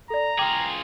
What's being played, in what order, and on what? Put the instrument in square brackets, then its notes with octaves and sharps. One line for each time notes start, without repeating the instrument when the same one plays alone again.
[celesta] A4 D5 [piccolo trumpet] A#5
[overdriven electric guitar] F4 G#4 [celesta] G5 D6